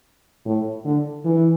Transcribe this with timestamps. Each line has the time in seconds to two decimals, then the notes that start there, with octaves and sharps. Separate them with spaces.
0.46 A2
0.85 D3
1.25 E3